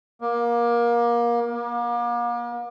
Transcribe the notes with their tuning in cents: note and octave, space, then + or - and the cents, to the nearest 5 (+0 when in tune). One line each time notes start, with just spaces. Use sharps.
A#3 +25
A#3 +40